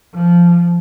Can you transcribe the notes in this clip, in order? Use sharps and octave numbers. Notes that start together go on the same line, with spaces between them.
F3